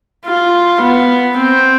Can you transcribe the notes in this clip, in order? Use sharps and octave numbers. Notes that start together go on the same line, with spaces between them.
F4
B3
C4